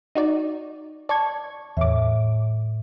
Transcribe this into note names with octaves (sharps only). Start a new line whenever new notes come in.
D#4 F#4 D5
D5 A5 C#6 G#6
E2 A2 C#5 E5 D6